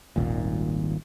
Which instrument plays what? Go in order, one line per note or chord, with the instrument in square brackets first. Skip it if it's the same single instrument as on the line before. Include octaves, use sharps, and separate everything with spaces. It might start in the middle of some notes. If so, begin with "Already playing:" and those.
[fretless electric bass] D#1 G#1 D#2 A#2